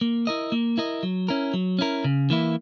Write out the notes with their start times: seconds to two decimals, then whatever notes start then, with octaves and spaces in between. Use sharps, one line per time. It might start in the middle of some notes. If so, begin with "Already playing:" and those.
0.01 A#3
0.27 E4 A#4 D#5
0.52 A#3
0.78 E4 A#4 D#5
1.03 F#3
1.28 C#4 E4 A#4
1.54 F#3
1.79 C#4 E4 A#4
2.04 C#3
2.30 E3 A#3 E4